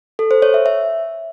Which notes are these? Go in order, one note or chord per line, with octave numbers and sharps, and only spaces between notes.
A4
C5
C#5
E5
E5